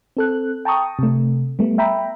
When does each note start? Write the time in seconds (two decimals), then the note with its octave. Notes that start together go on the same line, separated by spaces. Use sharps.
0.17 C4 A4 F#6
0.65 G5 A5 A#5 C#6 D#6
0.99 C3 A3
1.59 G3 A3 B3
1.78 E5 G5 A#5 B5